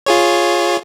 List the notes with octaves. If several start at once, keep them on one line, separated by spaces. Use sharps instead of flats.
F4 G#4 C#5